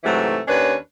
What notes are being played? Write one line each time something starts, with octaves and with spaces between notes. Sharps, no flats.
G#2 C3 E3 F#3 A3
D#2 C#4 D4 B4 C#5